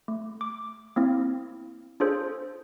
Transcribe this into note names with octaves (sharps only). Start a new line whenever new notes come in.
A3
D6
A#3 C4 E4
D4 F4 G#4 A4 C5